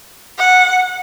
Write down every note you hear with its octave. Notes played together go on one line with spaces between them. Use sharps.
F#5